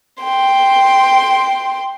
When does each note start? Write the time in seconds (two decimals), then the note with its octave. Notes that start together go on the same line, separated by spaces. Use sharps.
0.23 G5 C6